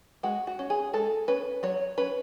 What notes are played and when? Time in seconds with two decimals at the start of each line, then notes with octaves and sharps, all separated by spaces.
0.23 G#3 F#4
0.47 F#4
0.59 C#4
0.70 G#4
0.93 G#3 A4
1.28 C#4 B4
1.63 F#3 C#5
1.98 C#4 B4